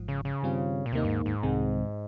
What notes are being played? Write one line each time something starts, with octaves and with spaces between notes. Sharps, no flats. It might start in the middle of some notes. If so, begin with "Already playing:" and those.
Already playing: G#1 G#2 F3
C#3
C#3
G2 D#3 G3 C4 F4
A#2
D#2 C3 D#3 A#3 D#4
G2
G#2
G#2
C2 C3 D#3 G#3 C4